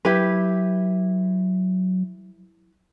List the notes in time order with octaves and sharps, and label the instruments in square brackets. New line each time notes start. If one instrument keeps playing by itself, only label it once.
[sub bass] F#3 [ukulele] E4 G4 B4